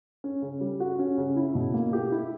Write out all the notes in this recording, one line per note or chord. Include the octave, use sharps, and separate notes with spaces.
C#4
C#3
G3
F#4
C#4
C#3
E4
B2
A#3
G4
E4